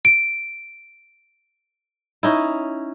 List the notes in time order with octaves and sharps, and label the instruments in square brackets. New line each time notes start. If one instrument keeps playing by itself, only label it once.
[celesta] D7
[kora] C#4 D#4 E4